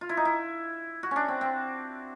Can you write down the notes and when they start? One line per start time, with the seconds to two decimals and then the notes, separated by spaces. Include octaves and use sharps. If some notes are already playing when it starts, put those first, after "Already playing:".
0.01 F4
0.09 E4
0.17 D#4
0.25 E4
1.03 F#4
1.11 C#4 D4
1.28 C4
1.41 C4